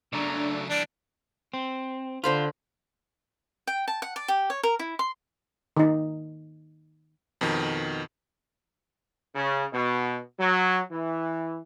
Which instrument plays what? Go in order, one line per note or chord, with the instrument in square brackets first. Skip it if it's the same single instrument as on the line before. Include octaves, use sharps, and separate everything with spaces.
[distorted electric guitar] C#3 F#3 [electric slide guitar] A3 D5 A#5 [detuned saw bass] D4
[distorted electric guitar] E3 G3 [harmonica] D4
[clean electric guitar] C4
[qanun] D3 C5 B5 [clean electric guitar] F4
[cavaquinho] G5
A5
F#5
D5
G4
C#5
A#4
E4
C6
[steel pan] D#3 D#4
[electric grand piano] F2 B2 D#3
[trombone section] C#3
B2
F#3
E3